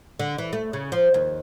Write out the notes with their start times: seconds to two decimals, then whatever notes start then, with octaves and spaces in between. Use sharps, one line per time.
0.19 D3
0.38 E3
0.53 A3
0.73 C#3
0.92 F3
1.14 D#2